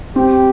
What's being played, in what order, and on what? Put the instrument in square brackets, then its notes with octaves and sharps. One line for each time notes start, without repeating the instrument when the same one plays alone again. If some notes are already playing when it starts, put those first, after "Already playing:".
[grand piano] C4 [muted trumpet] G4